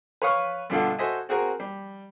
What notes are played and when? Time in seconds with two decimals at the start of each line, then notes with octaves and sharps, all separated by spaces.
0.22 B4 C#5 F5 C#6 D#6 F6
0.70 G2 B2 D3 F4 A4 F#5
0.99 F#4 A4 C5 D#5 E5 G#5
1.29 C4 F#4 G#4 A#4
1.60 G3